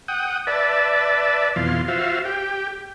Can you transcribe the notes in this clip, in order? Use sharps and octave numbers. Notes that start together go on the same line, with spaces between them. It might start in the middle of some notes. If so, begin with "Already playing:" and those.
F#5 G5 D#6
B4 D5 E5 A5
F2 B2 E3 F5 C6
F4 F#4 C5 E5 F5
G4 G5